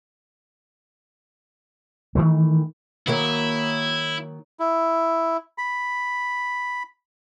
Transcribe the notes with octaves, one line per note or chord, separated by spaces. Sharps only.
D#3 E3 A3
D#3 F#3 A#3 E4
E4
B5